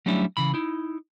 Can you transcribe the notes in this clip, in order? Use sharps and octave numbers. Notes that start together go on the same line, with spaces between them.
F#3 G3 A3 C#4 D4 E4
C#3 E3 B5
D#4 E4